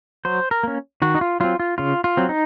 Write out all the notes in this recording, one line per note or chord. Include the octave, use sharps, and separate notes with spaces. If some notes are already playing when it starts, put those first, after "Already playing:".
F#3 C5
A#4
A#3 C#4
D#3 F#4
D#4
F4
F#3 C4 F4
F4
C#3 F4
F4
F#3 C4
D#4